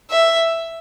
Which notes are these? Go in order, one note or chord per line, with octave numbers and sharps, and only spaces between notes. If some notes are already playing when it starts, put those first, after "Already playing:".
E5